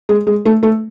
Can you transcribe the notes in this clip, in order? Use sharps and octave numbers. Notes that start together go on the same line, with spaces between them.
G#3
G#3
A3
A3